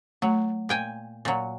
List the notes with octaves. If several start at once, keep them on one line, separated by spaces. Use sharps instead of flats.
F#3 A3
A#2 G5 G#5
A#2 F#3